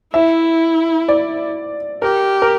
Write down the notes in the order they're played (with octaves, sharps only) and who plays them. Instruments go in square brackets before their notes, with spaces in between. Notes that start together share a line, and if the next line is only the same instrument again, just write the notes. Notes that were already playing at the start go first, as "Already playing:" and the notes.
[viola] E4 [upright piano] E5
[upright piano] D5
[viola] G4 [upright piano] A#4
[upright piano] A#4